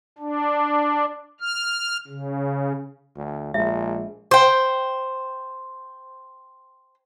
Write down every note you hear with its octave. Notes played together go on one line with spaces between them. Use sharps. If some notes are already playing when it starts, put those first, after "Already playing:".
D4
F6
C#3
D2
A#1 G#3 E5
C5 G5